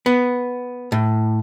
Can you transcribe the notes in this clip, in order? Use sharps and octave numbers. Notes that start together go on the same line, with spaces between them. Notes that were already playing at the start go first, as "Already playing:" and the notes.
B3
A2